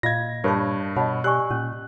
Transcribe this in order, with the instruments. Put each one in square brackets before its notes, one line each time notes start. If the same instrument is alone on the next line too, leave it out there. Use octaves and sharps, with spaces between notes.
[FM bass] A#2 [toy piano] F4 D#5 F5 [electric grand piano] G#6 A#6
[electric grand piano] G2 [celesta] A#4 A5 [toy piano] C#5 B5 C#6
[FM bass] B2 [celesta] C#5 F#5 A5 [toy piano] D#5 B5
[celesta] G4 D5 G#5 [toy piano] C#6 E6 [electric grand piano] F#6
[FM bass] A#2 [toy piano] C#4